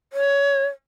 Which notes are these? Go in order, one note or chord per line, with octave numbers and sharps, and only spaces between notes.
C#5